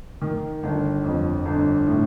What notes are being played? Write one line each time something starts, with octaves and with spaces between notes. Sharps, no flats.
D#3
G1
F2
G1
A2